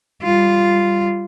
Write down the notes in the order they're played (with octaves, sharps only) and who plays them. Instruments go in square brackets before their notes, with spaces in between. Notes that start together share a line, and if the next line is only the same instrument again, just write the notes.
[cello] G3 F4